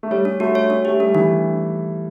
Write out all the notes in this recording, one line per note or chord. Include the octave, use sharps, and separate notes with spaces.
A3
G3 C#5
D4
A3 F#4
C#5
D4
A3 G4
G3 D4
E3 D4